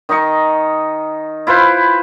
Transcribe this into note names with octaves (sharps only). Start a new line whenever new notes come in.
D#3 D#4 D#5 C#6
E4 F4 B4 C5